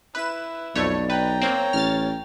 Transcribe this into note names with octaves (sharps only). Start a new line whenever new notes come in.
E4 B4 E7
B1 F2 A3 C#5 D5
B4 G5 A#5
A#3 C4 C#5
A1 F6 A6